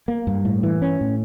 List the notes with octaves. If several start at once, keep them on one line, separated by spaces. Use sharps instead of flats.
A#3
G2
A2
E3
C#4
A2